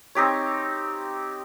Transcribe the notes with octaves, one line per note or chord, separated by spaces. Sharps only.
C4 D#4 G4 C#5